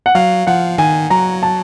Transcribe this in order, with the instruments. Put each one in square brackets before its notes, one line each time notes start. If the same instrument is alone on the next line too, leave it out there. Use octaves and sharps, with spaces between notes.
[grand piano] F#5
[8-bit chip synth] F#3 [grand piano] F5
[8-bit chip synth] F3 [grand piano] F#5
[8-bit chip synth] D#3 [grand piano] G#5
[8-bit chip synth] F#3 [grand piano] A#5
[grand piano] A5